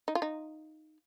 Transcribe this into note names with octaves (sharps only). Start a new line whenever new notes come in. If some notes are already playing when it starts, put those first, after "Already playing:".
D#4
F4
D#4